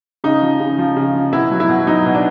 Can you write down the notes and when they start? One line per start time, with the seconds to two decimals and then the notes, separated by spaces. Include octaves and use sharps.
0.24 C#3 D#4
0.42 F3
0.60 C#3
0.78 F3
0.97 C#3
1.15 F3
1.33 B2 E4
1.51 F#3
1.60 E4
1.69 B2
1.87 F#3 D#4
2.06 B2
2.15 D4